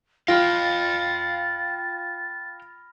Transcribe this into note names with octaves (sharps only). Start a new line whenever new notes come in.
F4 F5 G5 B5 F6 A6 A#6